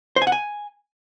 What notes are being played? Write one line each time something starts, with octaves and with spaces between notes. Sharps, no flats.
C5
G#5
F#5
G#5